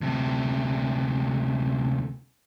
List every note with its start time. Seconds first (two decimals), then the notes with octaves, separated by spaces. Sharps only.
0.01 D2 C3